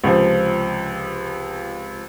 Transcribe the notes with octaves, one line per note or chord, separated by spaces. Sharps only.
C#2 C3 F3